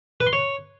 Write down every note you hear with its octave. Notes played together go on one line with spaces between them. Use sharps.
B4
C6
C#5